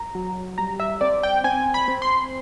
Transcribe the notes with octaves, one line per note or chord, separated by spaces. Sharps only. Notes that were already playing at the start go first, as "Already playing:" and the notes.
Already playing: A#5
F#3
G3 A#5
E5
C4 D5
G5
C4 G#5
B5
C4
C6